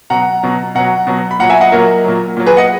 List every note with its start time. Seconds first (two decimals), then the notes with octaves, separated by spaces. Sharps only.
0.10 B2 F#3 F#5 A#5
0.43 B2 F#3
0.75 B2 F#3 F#5 A#5
1.07 B2 F#3
1.31 B5
1.39 A#2 F#3 F#5 A#5
1.50 E5 G#5
1.61 D#5 F#5
1.72 A#2 F#3 A#4
2.04 A#2 F#3
2.37 A#2 F#3
2.47 G#4 B4
2.57 D#5 F#5